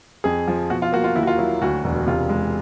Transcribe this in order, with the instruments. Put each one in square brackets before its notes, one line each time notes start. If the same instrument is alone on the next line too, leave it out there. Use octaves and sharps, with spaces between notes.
[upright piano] F2 G#4
F3
B2 F#4
F4
A#3 F#4
F4
D#2 E4
F#4
F4
F#3 E4
D2 F#4
E1
C3 F4
G#3